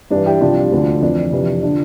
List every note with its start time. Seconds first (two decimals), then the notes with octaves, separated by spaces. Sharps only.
0.11 G2 E3 D4
0.26 E4 G4
0.41 C2 C3 F3 D4 F4
0.72 D2 D3 F3
1.02 F2 E3 D4
1.32 F2 C3 E3
1.63 D3 F3 D4